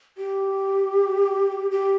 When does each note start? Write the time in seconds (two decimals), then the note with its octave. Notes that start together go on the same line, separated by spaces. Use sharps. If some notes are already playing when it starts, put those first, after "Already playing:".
0.18 G4
1.71 G4